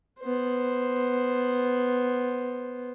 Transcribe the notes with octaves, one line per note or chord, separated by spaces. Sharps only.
B3 C5